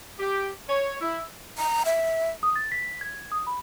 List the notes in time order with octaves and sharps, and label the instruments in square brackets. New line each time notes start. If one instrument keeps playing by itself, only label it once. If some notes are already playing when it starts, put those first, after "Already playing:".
[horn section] G4
C#5
E4
[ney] A#5
E5
[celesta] D#6
A6
B6
G#6
D#6
B5